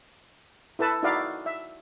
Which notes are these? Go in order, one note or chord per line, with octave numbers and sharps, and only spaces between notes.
E4 A4 B4 A5
D#4 E4 F#4 D5 F5
E5